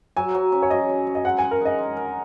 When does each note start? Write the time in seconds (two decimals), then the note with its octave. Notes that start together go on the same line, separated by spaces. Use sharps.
0.17 F#3 G#5
0.35 F#3
0.52 C#4
0.62 C#5
0.70 F#3 D#5
0.89 C#4
1.07 C#4
1.15 D#5
1.25 G#3 F#5
1.38 G#3 G#5
1.51 A#4
1.61 D#4 D#5
1.79 G#3
1.97 A#4